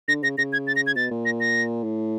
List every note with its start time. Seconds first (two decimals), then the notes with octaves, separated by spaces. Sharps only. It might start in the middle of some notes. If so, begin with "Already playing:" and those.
0.08 D3 A#6
0.23 C#3 A#6
0.38 C#3 A#6
0.53 G#6
0.67 A6
0.76 A#6
0.87 G#6
0.96 B2 A6
1.11 A#2
1.25 A#6
1.40 A#6
1.83 A2